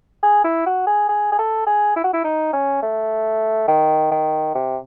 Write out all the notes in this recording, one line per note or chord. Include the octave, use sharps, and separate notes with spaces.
G#4
E4
F#4
G#4
G#4
G#4
A4
G#4
E4
F#4
E4
D#4
C#4
A3
D#3
D#3
C3